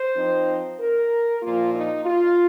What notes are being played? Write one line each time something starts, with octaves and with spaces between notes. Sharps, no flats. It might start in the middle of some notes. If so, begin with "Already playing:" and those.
Already playing: C5
F3 C4 D#4
A#4
A#2 F3 A#3 F4
D#4
F4